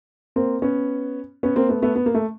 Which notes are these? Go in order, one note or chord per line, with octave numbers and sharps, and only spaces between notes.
A#3 C4
B3 C#4
B3 C#4
A#3 C4
A3 B3
A3 B3
B3
A#3
A3